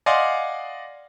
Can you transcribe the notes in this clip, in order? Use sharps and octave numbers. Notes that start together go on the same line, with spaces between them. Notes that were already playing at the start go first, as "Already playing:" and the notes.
D5 D#5 F5 F#5 G#5 C6